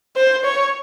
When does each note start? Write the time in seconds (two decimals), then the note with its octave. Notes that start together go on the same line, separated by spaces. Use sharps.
0.16 C5
0.45 C#5